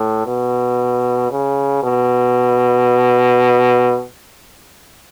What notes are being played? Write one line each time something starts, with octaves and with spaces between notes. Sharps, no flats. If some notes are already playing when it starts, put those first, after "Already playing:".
Already playing: A2
B2
C#3
B2